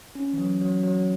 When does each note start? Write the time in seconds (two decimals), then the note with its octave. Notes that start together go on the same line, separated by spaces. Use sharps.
0.15 C#4
0.33 E3
0.38 F#3
0.61 F#3
0.83 F#3